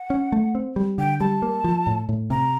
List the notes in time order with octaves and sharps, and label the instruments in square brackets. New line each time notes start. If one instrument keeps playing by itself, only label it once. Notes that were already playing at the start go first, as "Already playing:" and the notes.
Already playing: [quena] F#5
[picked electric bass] C#4
A3
C4
G3
[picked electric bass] D3 [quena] G5
[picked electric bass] G3 [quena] A5
[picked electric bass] A#3
F3
A2
A2
[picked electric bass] C3 [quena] A#5